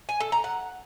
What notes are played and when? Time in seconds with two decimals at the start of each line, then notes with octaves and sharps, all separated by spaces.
0.09 G#5
0.20 A4
0.32 A#5
0.44 F#5